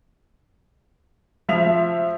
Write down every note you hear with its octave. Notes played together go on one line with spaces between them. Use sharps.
F3 E5 F7